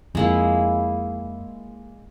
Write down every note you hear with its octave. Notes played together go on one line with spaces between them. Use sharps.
F2 G#3 A#3 E4